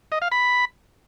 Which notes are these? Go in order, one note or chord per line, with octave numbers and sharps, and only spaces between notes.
D#5
F5
B5